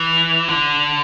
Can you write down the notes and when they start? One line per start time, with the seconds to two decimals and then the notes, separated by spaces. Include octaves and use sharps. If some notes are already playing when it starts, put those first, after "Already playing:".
Already playing: E3
0.48 D3